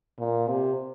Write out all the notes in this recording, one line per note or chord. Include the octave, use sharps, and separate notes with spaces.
A#2
C3